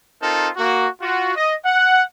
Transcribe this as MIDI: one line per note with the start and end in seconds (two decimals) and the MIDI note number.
0.20 0.49 60
0.20 0.49 63
0.20 0.49 65
0.20 0.49 69
0.20 0.49 70
0.57 0.87 58
0.57 0.87 66
1.01 1.34 65
1.01 1.34 66
1.36 1.54 75
1.64 2.03 78